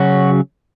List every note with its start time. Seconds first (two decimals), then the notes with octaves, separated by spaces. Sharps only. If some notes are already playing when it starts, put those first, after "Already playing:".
Already playing: C#3 F#3 C#4 F#4